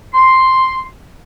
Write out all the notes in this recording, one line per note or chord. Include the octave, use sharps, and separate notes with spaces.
C6